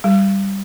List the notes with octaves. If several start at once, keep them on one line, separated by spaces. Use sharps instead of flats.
G3